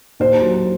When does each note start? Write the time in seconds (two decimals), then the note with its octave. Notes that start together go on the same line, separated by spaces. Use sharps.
0.20 D#2 C5
0.42 F#3